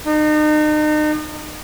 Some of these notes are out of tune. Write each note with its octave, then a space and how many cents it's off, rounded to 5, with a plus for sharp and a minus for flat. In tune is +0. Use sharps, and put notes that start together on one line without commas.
D#4 -40